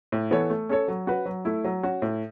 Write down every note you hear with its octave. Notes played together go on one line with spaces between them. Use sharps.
A2
E3 B3 A4 C#5
A3
C#4 A4 C#5
F#3
C#4 F#4 B4
F#3
A3 E4
F#3
C#4 F#4
A2